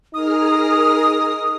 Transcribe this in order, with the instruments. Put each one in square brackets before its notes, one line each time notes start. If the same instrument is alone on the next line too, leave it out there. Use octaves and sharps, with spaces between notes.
[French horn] D#4 [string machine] G#4 A#4 F6 [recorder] D#6